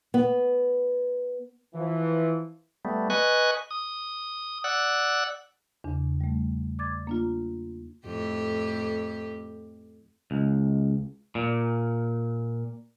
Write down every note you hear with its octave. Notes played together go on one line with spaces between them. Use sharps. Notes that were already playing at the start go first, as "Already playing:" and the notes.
B3
E3 F3
G3 A3 B3
B4 D#5 G#5 C#6 F#6
D#6
D5 F#5 E6 F#6
E2 C#3 D4
G3 A3
D5 D6 G#6 A6
A#3 D4 F4
F2 A2 G4
C#2
A#2